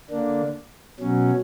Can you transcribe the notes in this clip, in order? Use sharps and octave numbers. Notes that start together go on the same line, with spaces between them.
D3 A#3 D4
B2 F#3 C#4